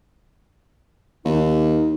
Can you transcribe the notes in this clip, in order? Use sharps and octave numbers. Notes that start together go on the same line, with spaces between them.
D#2 D#4